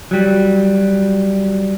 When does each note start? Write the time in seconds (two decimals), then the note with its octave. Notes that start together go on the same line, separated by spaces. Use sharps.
0.11 F#3 G3